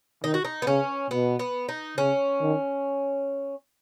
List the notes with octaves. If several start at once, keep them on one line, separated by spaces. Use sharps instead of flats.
D#3 D#4
F#4
D#4
B3
C#3 C#4
B2 B3
B3
D#4
C#3 C#4
D#3